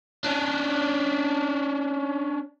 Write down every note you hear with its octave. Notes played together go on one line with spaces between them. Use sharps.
C#4 D4